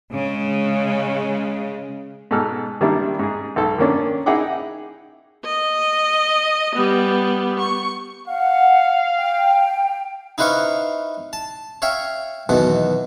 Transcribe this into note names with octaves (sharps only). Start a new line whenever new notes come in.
C#3 G#3
G#2 B2 A4 G#5 F6 F#6
D#3 G3 A#3 D4 E4
G#2 G#4
B1 A4
D#3 A#3 C#4 D4
D#4 E4 G#4 F#5 G5 D6
D#5
G3 B3
C#6
F5 F#5
G5
D#4 E4 B4 C5 F5 C#6
A5
C#5 E5 F5 G5
E2 B2 D#3 F#3